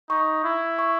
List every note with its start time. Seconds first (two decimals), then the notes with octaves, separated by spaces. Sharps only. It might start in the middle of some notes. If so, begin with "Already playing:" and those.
0.10 D#4 C#6
0.44 E4
0.78 C#6